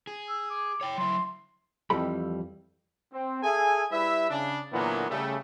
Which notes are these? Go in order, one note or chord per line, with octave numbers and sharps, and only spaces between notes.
G#4
E6
D6
C#5 G5
F#3 E4 C6
F2 E3 F3 G3 A4 B5
C4
G#4 A4 E5 G#5
G3 E4 B4 E5
C#3 D4
A#2 D3 E3 F#3 A#3 B3
C#3 G3 A3